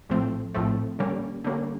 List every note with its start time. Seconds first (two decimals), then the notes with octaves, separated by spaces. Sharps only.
0.09 A#1 A2 F3 A3 C4
0.54 A#1 A2 F3 A3 C4
0.99 D3 G3 A#3 C#4
1.44 D3 G3 A#3 C#4